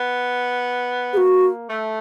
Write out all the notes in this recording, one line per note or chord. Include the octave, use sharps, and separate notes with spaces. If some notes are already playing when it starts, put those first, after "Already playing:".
Already playing: B3
A#3 F#4 G#4
A3